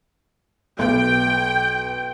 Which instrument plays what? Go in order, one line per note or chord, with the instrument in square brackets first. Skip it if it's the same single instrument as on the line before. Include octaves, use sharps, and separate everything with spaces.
[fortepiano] B1 [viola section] G5